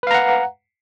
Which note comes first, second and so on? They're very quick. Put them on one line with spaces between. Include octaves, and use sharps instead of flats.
B4 F5 A#5 F#5